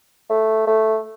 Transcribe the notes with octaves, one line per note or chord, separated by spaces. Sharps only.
A3
A3